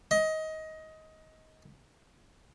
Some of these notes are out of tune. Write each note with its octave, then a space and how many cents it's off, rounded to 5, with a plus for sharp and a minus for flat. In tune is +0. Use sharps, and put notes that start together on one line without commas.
D#5 +20